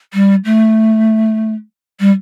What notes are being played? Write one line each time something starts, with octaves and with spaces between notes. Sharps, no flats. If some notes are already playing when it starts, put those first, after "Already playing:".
G3
A3
G3